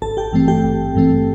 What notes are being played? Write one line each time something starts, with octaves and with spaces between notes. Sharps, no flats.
G#1 A4 A5
G4 G5
G2 E3 A3 C4
G4 G5
G#1
G2 E3 A3 C4